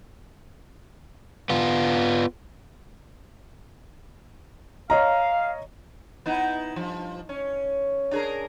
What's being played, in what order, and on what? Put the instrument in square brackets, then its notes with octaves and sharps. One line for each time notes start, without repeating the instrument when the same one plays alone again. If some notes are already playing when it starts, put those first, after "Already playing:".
[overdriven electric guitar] B3 F4
[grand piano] C#5 D#5 A#5 [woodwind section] F5
[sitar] B3 D#4 E4
G2 F3
C#4
D4 G#4 A#4